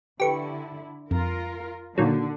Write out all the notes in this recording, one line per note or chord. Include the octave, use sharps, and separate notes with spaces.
D3 E4 G4 A4 B4 G5 C#6
F2 F4 A#4
A#2 D3 D#3 F#3